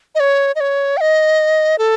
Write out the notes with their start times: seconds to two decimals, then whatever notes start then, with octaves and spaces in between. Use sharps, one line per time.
0.15 D#5
0.20 C#5
0.56 D#5
0.60 C#5
0.97 G5
1.01 D#5
1.78 A4